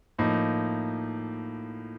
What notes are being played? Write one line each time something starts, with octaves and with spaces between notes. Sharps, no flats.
A2 F3 A#3 D#4